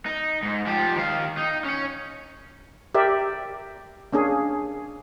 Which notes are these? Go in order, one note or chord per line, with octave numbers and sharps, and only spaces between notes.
D#4
G#2
F3 G4
D#3 F5
D#4
C#4 C#5
G4 A#4 D5 E5
A#3 C#4 D4 G#4